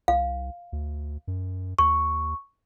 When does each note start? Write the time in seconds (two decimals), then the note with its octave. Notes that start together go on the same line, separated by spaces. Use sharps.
0.08 C2 F5
0.73 D2
1.27 F#2
1.79 D#2 C#6